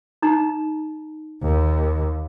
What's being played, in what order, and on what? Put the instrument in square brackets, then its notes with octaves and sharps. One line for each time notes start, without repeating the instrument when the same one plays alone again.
[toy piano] D#4 A#5
[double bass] D#2